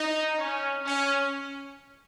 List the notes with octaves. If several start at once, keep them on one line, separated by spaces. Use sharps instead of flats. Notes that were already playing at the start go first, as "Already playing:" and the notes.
Already playing: D#4
C#4
C#4